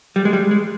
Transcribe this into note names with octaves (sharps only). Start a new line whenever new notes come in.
G3
G#3
G3
G#3